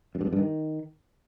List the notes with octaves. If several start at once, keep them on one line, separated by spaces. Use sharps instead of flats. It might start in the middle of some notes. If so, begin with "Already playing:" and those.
F#2
G2
F2
G2
D#3